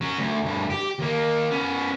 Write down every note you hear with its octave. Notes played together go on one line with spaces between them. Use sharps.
F#3 C#4
D2
D2 G2
G4
D#2 A#3
B3 C#4